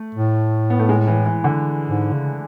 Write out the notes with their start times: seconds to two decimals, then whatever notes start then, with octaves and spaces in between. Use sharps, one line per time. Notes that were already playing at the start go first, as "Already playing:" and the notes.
Already playing: A3
0.15 A2
0.70 B3
0.79 A3
0.89 G#3
1.07 E3
1.26 E3
1.44 D3
1.88 G#2
2.13 C#3